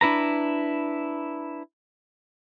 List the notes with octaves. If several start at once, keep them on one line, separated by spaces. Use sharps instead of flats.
D4 E4 B4 A#5